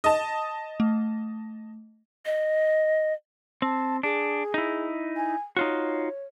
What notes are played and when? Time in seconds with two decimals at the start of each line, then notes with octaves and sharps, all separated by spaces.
0.04 D#5 A5
0.80 A3
2.26 D#5
3.62 C4 A5
4.03 D4 G#4
4.54 D#4 E4
5.16 G#5
5.57 D#4 F4 F#4 C#5